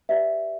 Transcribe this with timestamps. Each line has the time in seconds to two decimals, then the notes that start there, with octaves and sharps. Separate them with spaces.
0.09 G4 B4 D5 E5